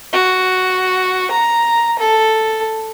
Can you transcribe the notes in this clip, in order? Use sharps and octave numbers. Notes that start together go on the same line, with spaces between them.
F#4
A#5
A4